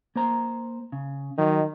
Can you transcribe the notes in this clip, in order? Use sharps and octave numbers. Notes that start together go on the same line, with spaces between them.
A#3 C5 A#5
C#3
D#3 F#3 D#4